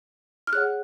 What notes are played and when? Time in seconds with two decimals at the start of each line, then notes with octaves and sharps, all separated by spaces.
0.47 F6
0.52 G#4 C#5 F#5 F#6